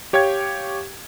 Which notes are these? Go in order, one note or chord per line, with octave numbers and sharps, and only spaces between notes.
G4 C#5 F5 G5 G#6